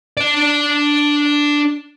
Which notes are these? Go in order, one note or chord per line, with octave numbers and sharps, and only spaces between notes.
D4 D5